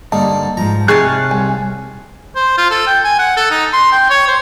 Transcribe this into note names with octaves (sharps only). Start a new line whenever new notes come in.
G2 D3 A#3 D#4 A5
G#2 F3 A#5
C3 D#4 G#4 C#5 A5 C#6 F6 F#6
C2 G#5
C5
F4
A4
G5
G#5
F#5
A4
D#4
C6
G5
C#5
C5